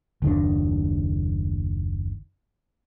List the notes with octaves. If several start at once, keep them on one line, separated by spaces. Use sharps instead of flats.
F#1 D#2 D#3 D4